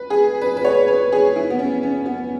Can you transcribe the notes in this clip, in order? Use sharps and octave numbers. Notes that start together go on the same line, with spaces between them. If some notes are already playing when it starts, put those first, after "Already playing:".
Already playing: B4
G#4
B4
B4
C#5
B4
G#4
E4
B3
C#4
C#4
B3